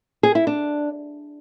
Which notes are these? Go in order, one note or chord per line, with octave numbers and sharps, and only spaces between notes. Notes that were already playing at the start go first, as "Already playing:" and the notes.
G#4
E4
D4